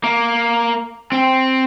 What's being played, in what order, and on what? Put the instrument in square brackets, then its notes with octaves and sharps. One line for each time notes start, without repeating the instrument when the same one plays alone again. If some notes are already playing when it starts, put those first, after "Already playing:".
[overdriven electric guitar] A#3
C4